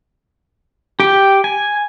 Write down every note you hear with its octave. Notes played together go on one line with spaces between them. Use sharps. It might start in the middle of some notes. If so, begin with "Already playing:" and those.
G4 G5
G#5